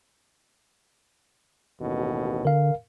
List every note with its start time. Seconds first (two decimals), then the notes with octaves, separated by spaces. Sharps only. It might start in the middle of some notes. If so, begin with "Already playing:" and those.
1.81 A1 D#2 B2
2.45 D3 A#4 F5